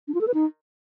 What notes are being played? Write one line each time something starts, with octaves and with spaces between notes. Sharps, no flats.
D4
F4
A4
B4
D#4